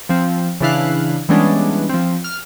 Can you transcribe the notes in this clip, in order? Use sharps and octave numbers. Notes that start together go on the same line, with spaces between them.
F3 C4
C#3 E3 D4 E4 F5 F#6
E3 G3 G#3 B3 C#4 D4
F3 C4
F6